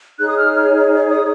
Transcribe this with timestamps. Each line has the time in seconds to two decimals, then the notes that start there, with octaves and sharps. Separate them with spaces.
0.19 D#4 G#4 C#5 F#6
0.29 D#6
0.37 F6
0.55 F6
1.09 D#6